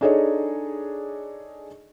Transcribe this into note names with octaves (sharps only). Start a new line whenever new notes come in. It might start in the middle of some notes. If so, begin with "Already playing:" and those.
D4 D#4 G#4 A4 C#5 D#5